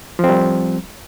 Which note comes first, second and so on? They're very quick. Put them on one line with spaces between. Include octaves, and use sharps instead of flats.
F3 C4 G3